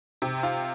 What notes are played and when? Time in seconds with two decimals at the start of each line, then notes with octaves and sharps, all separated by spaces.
0.22 C3
0.43 F4